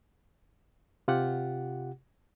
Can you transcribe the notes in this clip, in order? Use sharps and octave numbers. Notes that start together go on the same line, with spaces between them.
C3 F4 G4 F#5